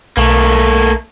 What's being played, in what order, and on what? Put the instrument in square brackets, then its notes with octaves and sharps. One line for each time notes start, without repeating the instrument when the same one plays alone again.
[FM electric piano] B1 [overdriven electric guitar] A3 A#3